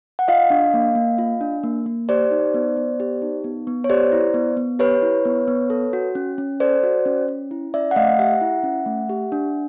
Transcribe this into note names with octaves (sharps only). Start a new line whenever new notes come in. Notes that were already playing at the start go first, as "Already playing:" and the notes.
F#5
F4 D#5 F5
D4
A#3
A#3
F4
D4
A#3
A#3
G4 C5 D5
D#4
B3
B3
G4
D#4
B3
B3
C#5
G4 C5 D5
E4
B3
B3
G4 B4 C#5
E4
B3
B3
A4
F#4
C#4
C#4
A4 C5 D5
F#4
C#4
C#4
E4
C#4 D5 E5
F#5
A3 D#5 F5
G4 E5 F#5
E4
C#4
A3
G4
D4